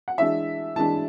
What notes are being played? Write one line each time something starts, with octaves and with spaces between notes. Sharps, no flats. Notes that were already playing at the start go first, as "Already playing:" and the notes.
F#5
E3 G#3 D4 E5
E3 G#3 D4 A5